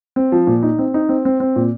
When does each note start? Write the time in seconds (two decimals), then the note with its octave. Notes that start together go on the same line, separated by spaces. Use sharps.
0.16 C4
0.32 F3
0.47 A#2
0.63 D#4
0.79 C4
0.94 D#4
1.09 C4
1.25 C4
1.40 C4
1.56 A#2